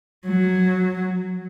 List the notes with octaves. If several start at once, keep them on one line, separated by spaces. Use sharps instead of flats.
F#3